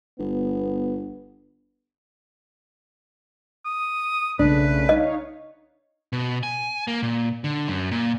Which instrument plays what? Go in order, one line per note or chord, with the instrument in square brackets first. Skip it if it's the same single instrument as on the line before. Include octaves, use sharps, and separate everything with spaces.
[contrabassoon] G1 [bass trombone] B3
[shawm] D#6
[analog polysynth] B1 C#3 A3 [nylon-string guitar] D4 [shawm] B4
[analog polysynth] D#4 C#5 F5 [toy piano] D#5
[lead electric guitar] B2
G#5
A#3
A#2
D3
F#2
A#2